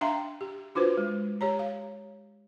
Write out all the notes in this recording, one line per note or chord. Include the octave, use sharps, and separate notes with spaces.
D4 E5 F5 G5 A#5 C6
G4
D4 F4 F#4 B4 C5
G#3
G4 C#5 A#5
F5